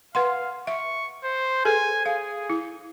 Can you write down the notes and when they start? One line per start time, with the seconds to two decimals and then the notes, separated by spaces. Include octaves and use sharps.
0.15 B4 F5 F#5 C6
0.67 E5 C#6
1.24 C5
1.65 G#4 A4 B4 G#5
2.06 G#4 F5
2.50 E4